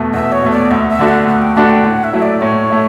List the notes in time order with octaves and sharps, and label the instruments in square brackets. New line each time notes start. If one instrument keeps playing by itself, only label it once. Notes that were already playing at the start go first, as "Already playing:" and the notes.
Already playing: [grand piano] E2 B2 A3
[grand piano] E2 [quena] E5
[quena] C#5
[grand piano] B2 A3
[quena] D5
[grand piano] D2 [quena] E5
[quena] E5
[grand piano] D3 A3 D4 F#4
[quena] F#5
[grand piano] D2 [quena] F#5
[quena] G5
[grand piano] D3 A3 D4 F#4 [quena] F#5
[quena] G5
[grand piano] A2 [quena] F#5
[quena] E5
[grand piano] F#3 A3 E4
[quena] D5
[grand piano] A2 [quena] C#5
[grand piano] A3 E4